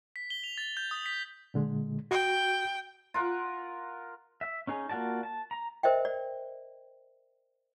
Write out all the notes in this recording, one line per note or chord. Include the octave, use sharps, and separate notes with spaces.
B6
G7
F7
A6
G6
D#6
B6
A#2 D3 G#3
F#4 G5
F4 A#4 F#5
E5
C#4 D#4 G#4
A#3 F4 F#4 D5 A5
A5
A#5
A#4 C5 D#5 E5 G5
D5